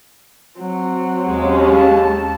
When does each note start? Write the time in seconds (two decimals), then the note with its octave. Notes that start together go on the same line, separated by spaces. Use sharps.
0.58 F#3 C4
1.27 D#2 G#3 C#4
1.73 A5